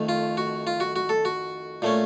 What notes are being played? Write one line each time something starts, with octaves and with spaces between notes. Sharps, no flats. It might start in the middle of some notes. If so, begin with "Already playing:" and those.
Already playing: F2 D#3 A3
F4
F#4
F4
F#4
F#4
A4
F#4
A#2 A3 C#4